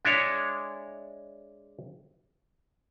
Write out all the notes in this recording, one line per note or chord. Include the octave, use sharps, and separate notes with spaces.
G#3 D4 E4 C#5